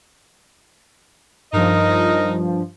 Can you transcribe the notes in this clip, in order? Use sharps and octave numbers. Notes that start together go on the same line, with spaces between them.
G2 F3 D#4 A#4 D#5